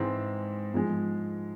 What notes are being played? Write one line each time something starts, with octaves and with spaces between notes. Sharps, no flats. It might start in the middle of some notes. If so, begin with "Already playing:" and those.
Already playing: G#2 E3 G#3 C4
G#2 F3 G#3